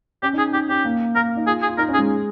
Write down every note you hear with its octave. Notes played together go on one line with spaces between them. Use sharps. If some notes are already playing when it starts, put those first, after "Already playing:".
C#4 G4
D#4
G#4
D#4 G4
C#4 G4
A#3
A#3 A#4
D#4
F4 G#4
G#4
F4
D#4 A#4
C#4
G#4
G#3